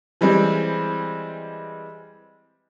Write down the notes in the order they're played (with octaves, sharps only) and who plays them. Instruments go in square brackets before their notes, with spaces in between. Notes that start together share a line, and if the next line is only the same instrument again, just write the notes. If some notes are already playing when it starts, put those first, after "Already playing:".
[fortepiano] E3 G3 G#3 C4